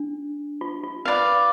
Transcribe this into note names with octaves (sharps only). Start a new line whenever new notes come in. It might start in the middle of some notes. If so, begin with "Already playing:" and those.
Already playing: D4
F4
F4
B4 D5 F5